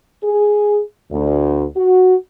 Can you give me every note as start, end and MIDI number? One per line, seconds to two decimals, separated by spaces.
0.23 0.80 68
1.11 1.65 38
1.76 2.15 66